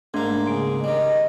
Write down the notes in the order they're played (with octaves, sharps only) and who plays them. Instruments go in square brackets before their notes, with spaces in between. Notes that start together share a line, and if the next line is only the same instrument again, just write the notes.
[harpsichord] G#2 A#3 [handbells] A3 D4 C6
[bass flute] C#3 [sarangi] G#4 [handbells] C6 D7
[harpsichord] D#3 G3 [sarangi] D#5